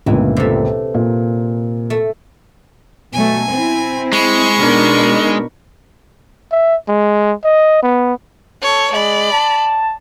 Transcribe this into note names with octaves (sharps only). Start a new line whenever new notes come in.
G1 C#2 A#2 E3
C3 A3
A#2
A3
B2 F#3 A3 G#5
C4 E4
G#3 B5 C#6
B2 D4 D#4 A#4
E5
G#3
D#5
B3
A4 C#5
G#3 D5 B5
A5